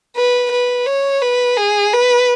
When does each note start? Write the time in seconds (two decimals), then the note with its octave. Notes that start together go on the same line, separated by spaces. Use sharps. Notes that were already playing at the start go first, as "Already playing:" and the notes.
0.16 B4
0.52 B4
0.87 C#5
1.22 B4
1.57 G#4
1.93 B4